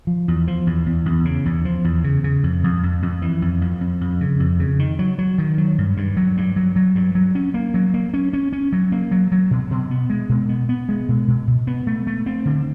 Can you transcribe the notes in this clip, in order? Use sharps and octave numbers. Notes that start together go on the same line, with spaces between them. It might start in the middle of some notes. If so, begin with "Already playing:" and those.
F3
E2
F3
E2
E2
E2
C#3
E2
F3
E2
C#3
C#3
F2
F2
F2
F2
E3
F2
F2
F2
F2
C#3
F2
C#3
D#3
F#3
F#3
D#3
F#3
G2
G2
F#3
G2
F#3
F#3
G2
F#3
C#4
A#3
F#3
A#3
C#4
C#4
C#4
F#3
A#3
F#3
F#3
B2
B2
B3
G#3
B2
B3
B3
G#3
B2
B2
B2
B3
A3
A3
C4
D3